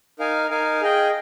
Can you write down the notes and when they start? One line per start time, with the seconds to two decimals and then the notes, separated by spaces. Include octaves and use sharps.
0.19 D#4 A#4 F5 G#5
0.50 D#4 A#4 F5 G#5
0.81 G#4 D#5 G5